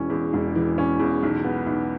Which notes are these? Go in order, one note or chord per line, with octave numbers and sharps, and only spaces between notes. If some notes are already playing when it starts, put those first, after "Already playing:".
Already playing: E1 E3 C#4
E2
E1
E3
C#4
E2
B1
B3
B1